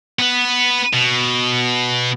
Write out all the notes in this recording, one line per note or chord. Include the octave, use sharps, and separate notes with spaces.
B3 B4
B2